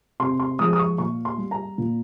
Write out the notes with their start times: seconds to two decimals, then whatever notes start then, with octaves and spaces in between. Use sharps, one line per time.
0.20 C3 C6
0.40 C6
0.59 F3 G#3 D#6
0.73 D#6
0.79 C#6
0.98 A#2 C#6
1.25 C6
1.38 G3
1.51 A#5
1.78 A#2